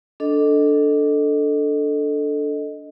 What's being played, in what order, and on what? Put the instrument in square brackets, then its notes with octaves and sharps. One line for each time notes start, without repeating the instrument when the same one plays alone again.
[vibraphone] D4 A4 D#5